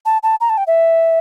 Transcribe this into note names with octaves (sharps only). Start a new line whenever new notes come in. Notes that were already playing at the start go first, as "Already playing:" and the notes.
A5
A5
A#5
A5
G5
E5